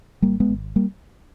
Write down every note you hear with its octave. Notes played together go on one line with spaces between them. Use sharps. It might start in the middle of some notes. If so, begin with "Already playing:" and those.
G#1 G3 A#3
G#3 B3
G#1
G3 A#3